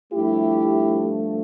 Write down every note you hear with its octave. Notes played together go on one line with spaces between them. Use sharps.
G2 F3 A3 E4 G4